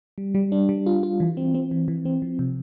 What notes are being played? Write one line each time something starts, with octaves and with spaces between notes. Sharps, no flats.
G3
G3
D4
G3
F4
F4
E3
C4
C4
E3
E3
C4
F3
C3